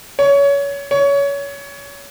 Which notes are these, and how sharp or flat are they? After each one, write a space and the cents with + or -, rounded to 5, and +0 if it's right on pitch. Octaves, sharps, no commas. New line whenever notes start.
C#5 +25
C#5 +25